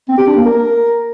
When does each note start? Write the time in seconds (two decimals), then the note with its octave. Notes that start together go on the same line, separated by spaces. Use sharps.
0.08 C4
0.18 G4
0.27 D4
0.36 A#3
0.45 A#4